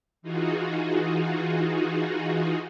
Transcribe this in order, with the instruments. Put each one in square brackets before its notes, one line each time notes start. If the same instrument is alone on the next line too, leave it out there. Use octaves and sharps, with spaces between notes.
[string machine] E3 D#4 F4 F#4 G#4